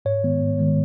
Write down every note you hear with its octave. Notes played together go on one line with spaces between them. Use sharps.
G#2 C#5
D#3 G#3 B3
G#2
D#3 G#3 B3